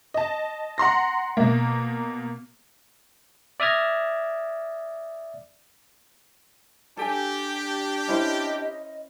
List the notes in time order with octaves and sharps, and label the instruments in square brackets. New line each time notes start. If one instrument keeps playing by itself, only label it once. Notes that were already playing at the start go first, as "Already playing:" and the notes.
[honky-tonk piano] D#5 A5
F#5 A#5 C6 A#6
B2 A#3
[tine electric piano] D5 E5 D#6 F6 G#6 A#6
[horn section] D4 G4 [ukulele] A4 G#5
[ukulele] C#4 E4 C5 [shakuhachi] D#5